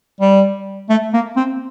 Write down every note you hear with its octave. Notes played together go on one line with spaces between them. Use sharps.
G3
A3
A#3
C4